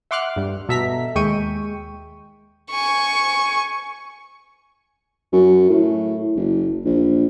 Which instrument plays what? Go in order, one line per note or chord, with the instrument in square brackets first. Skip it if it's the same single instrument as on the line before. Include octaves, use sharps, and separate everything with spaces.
[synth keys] E5 F#5 C6 D6 F6 F#6
G2 G3
B2 A4 E5 A#5 B6
D#2 G#3 G5 C#6 D#7
[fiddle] G#5 C#6
[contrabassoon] F#2
A2
F#1
A#1